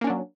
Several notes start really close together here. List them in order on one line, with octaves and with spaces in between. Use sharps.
A#3 C#4 D4 F#3